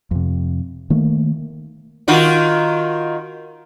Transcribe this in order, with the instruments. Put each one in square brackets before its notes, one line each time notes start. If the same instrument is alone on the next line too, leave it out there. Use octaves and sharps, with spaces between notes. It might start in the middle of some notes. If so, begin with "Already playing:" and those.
[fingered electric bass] F2 C3
D#3 A3 A#3
[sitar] D#3 F4 F#4